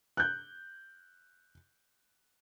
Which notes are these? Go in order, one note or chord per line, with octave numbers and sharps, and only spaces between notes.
F#6 G6